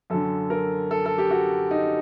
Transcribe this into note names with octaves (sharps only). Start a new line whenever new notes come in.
F#2 D3 A4
A#4
A4
A4
G4
F#4
D#4